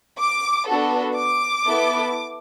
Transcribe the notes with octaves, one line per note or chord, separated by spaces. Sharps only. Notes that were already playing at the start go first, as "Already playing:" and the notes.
D6
B3 D4 F#4 A4
D6
B3 E4 A4